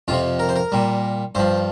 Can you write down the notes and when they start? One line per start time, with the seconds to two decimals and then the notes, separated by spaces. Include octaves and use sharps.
0.08 F2 C3 F3 F4
0.39 A#4
0.49 C5
0.56 A#4
0.72 A#2 G3
1.35 G2 F3 C5